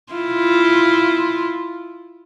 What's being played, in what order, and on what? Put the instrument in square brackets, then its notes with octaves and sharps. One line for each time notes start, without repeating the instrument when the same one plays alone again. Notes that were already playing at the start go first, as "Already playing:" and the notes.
[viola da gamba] E4 F4